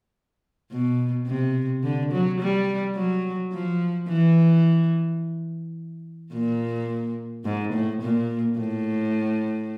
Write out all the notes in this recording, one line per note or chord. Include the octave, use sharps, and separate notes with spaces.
B2
C3
D3
F#3
G3
F#3
F3
E3
A#2
G#2
A2
A#2
A2